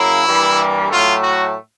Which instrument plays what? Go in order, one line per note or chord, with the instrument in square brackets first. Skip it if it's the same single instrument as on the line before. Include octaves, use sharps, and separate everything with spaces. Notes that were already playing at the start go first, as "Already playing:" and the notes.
Already playing: [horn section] F#2 C#3 F#3 A#3 E4
G2 E3 G3 A#3
A2 F#3 A3 F4
F#4